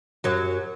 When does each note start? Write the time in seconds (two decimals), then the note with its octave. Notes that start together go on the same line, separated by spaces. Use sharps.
0.24 F#2 F#3